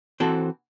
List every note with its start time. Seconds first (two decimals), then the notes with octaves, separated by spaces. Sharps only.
0.20 E3 C4 F#4 A4 C5